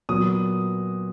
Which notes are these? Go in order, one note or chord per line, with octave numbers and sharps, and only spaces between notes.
A#2 F#3 B3 D#6